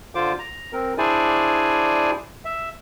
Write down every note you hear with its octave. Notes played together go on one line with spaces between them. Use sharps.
D3 F4 C5 D6
A#5
C4 A#4
D4 E4 G#4 C5 D5 G#5
E5